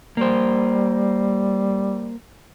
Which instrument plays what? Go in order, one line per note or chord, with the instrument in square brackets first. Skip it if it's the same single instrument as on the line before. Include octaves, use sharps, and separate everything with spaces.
[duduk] G3 [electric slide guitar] A#3 C5